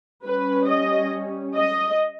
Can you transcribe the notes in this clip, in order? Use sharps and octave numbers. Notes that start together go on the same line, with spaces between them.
G3 C#4 B4
D#5
D#5